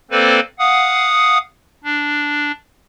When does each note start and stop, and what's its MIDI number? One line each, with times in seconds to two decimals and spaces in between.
0.11 0.40 58
0.11 0.40 60
0.11 0.40 69
0.11 0.40 71
0.11 0.40 72
0.11 0.40 74
0.59 1.38 77
0.59 1.38 78
0.59 1.38 87
1.84 2.51 62